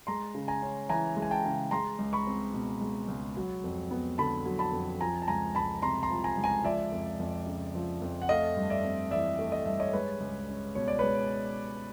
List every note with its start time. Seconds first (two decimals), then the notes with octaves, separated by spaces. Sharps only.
0.07 G#3 A#5 C6
0.35 C#3
0.48 G#5 A#5
0.62 C#4
0.89 E3 G#5 A#5
1.17 G#3
1.22 G#5
1.31 G5 A5
1.45 C#3
1.71 G#3 A#5 C6
1.99 C#2
2.13 B5 C#6
2.27 C4
2.54 B2
2.81 G#3
3.08 C#2
3.37 F#3
3.64 F2
3.91 B3
4.18 D3 A5 B5
4.45 F#3
4.59 A5 B5
4.73 F2
5.00 F3 G#5 A#5
5.22 A5
5.28 C#2 G#5 A#5
5.55 C#2 A5 B5
5.82 C3 A#5 C6
6.03 A#5 C6
6.10 F3
6.24 G#5 A#5
6.37 C#2
6.44 G#5 A#5
6.64 F3 D5 E5
6.92 F2
7.19 F2
7.47 C#3
7.75 F3
8.02 F2
8.22 F#5
8.29 A3 D#5 F5
8.57 G2
8.70 D5 E5
8.85 C4
9.11 E3 D5 E5
9.39 A3
9.52 D#5
9.66 G2 E5
9.80 C#5 D#5
9.93 G#3 B4 C#5
10.20 C#2
10.48 C#4
10.75 B2 C#5
10.88 D5
10.99 G#3 B4 C#5